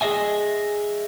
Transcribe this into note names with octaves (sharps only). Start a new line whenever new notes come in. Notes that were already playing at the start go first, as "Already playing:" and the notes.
G#4 B4 D#5 E5 G#5